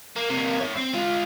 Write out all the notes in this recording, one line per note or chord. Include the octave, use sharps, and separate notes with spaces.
A#3
C3 A#3
C#5 E5
C4
G#3 F4